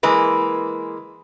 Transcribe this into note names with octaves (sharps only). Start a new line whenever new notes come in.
E3 G#3 A#3 B4